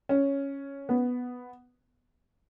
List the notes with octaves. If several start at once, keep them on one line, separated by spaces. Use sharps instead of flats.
C#4
B3